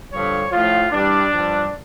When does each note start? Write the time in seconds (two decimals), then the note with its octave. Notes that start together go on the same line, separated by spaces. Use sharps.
0.11 G2 D3 F3 C#5
0.51 A2 F3 F4
0.92 G2 E3 G3 D4
1.32 G2 F3